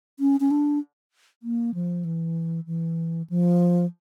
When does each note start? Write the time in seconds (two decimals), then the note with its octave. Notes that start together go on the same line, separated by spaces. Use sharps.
0.19 C#4
0.40 C#4
0.51 D4
1.43 A#3
1.74 F3
2.04 E3
2.66 E3
3.30 F3